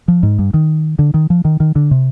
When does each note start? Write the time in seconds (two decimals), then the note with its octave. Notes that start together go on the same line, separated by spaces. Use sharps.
0.08 F3
0.23 G#2
0.39 G2
0.54 D#3
0.99 D3
1.14 D#3
1.30 F3
1.45 D#3
1.60 D#3
1.76 D3
1.91 C3